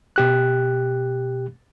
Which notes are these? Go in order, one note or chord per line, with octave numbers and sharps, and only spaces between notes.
B2 G4 F#6